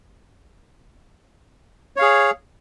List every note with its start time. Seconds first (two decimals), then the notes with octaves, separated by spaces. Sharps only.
1.96 C#5
1.99 F5
2.02 G#4